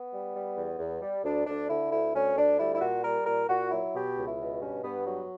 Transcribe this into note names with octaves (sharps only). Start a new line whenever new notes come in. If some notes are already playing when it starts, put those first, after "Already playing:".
Already playing: B3
G3
G3
E2
E2
G3
D2 D4
D2 D4
D3 E4
D2 E4
D2 C#4
D2 D4
G3 E4
E4
A#2 F#4
G3 A#4
A#2 A#4
A#2 F#4
F#3 E4
B2 G4
C#2
E4
B2
G2 C#4
G2 B3
F#3 B3